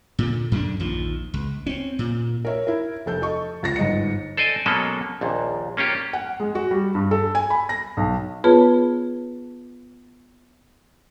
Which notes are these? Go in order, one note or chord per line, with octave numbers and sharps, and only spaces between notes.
A#2 D3
F#2 D3 D4
A#1 D#2 F3
C#2
C4 C#4
A#2
A#4 C#5 E5
E4 A#4
F1 A4 G6
A4 D#5 C#6
C#2 A6 A#6
G1 G#2 D#5 C#7
A4 C5 D5 D#5 G#5
B2 F#3 G#3 A#3 C#4 A4
A#1 D#2 A#2
A#3 C#4 F4 G4
F#5
G#3
F#4
G3
G2
A4
G#5
B5
A#6
B1
B3 F4 G#4 B4 C#5 A5